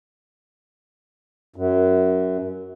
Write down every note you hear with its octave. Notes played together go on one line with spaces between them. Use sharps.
F#2